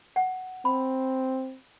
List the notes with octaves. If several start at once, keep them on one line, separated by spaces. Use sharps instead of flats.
F#5
C4 B5